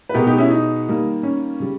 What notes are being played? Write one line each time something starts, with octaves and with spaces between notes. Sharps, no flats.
B4
B2 G#3 B3 G4 A#4
D#4 G4
C#4 E4
D#4
D#3 G3 A#3
C#4
C#3 G3